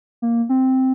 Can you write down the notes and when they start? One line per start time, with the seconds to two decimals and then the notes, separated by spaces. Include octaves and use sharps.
0.22 A#3
0.49 C4